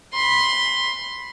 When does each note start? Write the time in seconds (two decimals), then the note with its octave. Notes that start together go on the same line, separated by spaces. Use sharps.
0.13 B5 C6